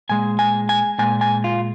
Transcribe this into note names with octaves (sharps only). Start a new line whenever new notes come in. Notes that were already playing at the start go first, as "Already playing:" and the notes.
A#2 G#3 G#5
G#5
G#5
A#2 G#3 G#5
G#5
F4